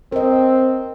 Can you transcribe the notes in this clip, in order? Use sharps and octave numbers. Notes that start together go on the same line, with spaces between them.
C4 A#4 D#5